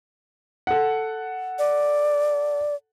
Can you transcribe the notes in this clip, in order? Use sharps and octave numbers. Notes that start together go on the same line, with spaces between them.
A4 F#5
D5